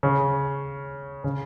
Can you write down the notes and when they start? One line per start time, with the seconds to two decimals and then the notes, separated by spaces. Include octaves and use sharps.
0.03 C#3
1.24 C#3